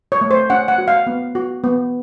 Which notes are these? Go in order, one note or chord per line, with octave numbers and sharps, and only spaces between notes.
C#5
A3
C5
C#4 F#5
F#5
F#4
F5
B3
F#4
B3